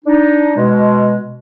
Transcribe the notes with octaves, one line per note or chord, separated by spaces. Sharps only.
D4 D#4
B2 G#3